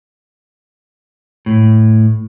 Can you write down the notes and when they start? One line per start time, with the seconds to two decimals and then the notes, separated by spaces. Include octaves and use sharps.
1.46 A2